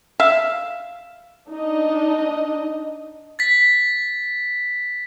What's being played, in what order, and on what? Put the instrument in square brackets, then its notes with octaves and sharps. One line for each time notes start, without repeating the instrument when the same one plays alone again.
[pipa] E5 F5
[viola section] D4 D#4 D#5
[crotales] A6 B6